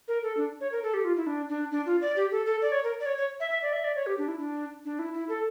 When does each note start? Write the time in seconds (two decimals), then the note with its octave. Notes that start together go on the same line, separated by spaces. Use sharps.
0.08 A#4
0.23 A4
0.37 D4
0.61 C#5
0.72 A#4
0.83 A4
0.94 G4
1.05 F4
1.17 E4
1.27 D4
1.49 D4
1.71 D4
1.86 F4
2.02 D5
2.16 G4
2.32 A4
2.46 A4
2.62 D5
2.72 C#5
2.84 A#4
3.00 D5
3.06 C#5
3.18 C#5
3.40 E5
3.51 E5
3.62 D5
3.73 E5
3.84 D5
3.96 C#5
4.07 G4
4.18 D4
4.28 E4
4.39 D4
4.85 D4
4.99 E4
5.14 E4
5.29 A4